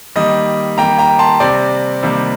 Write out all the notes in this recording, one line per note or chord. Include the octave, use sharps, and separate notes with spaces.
D#3 G3 A#3 D#5
D#3 G3 A#3 G5 A#5
G5 A#5
A5 C6
C3 G3 C4 D5
C3 D#3 G3 A#3